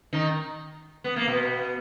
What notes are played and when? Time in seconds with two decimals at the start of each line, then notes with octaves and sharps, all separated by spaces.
0.13 D#3 D#4
1.04 B3
1.16 A#3
1.28 B2 B3